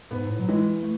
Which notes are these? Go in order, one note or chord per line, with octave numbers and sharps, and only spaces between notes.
G#2 B3
G#2
A2
F#3
E3 G#3
A3